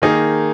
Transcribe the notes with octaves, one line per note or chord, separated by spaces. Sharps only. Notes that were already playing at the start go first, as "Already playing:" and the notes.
D#3 A#3 D#4 G#4